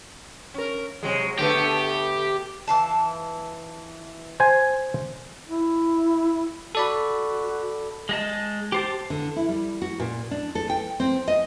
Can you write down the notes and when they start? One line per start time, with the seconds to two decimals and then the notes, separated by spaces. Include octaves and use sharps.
0.54 C#4 A#4
1.03 C3 F#3 G#3
1.39 D3 A3 B3 G4
2.67 E3 F5 A5
4.40 C5 G#5
5.49 E4
6.75 F#4 A4 D5 B5
8.09 G#3 D#5 A5
8.72 G4 C5 A5
9.10 D3
9.36 E4
9.49 G3
9.82 F#4
10.00 A#2
10.31 D4
10.55 A4
10.70 G5
11.00 C4
11.28 D#5